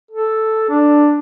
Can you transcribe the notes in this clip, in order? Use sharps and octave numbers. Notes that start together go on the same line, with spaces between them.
A4
D4